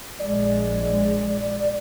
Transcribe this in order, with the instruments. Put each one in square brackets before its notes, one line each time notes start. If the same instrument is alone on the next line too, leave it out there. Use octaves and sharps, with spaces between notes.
[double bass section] A#1 G#3 [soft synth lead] D5